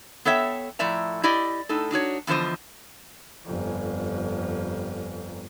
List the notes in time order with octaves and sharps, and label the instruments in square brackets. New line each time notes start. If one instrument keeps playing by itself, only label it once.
[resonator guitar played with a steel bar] B3 A4 C#5 E5 G5
A2 F3 D5 E5 A#5
E4 G4 D5 D#5
A2 D#4 A4
D4 D#4 F#4 C#5
E2 D3 F3 C5 D#5
[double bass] G1 F2